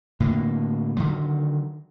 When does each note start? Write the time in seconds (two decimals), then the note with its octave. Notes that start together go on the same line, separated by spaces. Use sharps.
0.20 A2 D3 A#3
0.97 D3 D#3 F#3